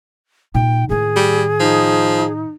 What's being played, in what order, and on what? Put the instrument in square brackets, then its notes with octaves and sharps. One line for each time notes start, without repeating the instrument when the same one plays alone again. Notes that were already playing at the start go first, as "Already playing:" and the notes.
[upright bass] A#2 D#4 [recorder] G5
[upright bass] A2 D#3 [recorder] G#4
[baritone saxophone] G3
[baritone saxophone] F3 [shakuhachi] D#4